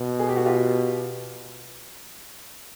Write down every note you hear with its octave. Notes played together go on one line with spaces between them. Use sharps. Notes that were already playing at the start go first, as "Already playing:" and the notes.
Already playing: B2
G#4
G4
F#4
F4 G4